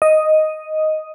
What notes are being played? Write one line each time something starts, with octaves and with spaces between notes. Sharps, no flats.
D#5